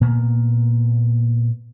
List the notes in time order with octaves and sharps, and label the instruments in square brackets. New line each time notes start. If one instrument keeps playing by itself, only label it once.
[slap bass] A#2 A#3 B3